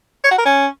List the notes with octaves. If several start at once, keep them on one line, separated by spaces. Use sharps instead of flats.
C#5
F#4
A#4
C#4